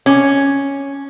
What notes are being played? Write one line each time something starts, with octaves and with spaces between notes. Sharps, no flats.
C#4